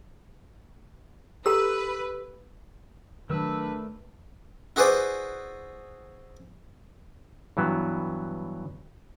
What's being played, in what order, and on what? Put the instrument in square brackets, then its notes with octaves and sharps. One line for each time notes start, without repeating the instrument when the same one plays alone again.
[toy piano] G4 A4 A#5 [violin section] B4 [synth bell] E6
[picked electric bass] D#3 F#3 [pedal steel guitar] A3 A#4 E6 [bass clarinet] D4 [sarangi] B4
[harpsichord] E4 F#4 G#4 B4 C5 D5
[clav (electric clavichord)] G2 E3 F#3 B3